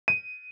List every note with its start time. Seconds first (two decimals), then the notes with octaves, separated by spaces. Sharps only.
0.08 D#7